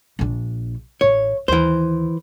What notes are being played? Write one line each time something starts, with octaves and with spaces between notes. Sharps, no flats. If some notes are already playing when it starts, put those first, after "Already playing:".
A#1 D4
A1 C#5
D#2 E3 C5